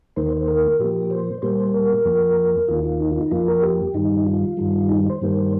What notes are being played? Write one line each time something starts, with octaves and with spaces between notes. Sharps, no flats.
D#2 D#3 A#3 C5
C5
C5
A#4
A#2 F3 A#3 G4
C5
A#2 G3 A#3 C5
A#4
F2 F3 A#3
D#2 D#3 A#3 F4
F4
D#4
F4
D#4
F2 F3 A#3 F4
A#4
G4
G2 D#3 G3 D#4
F4
G2 D#3 G3
D#4
C5
G2 D#3 G3 A#3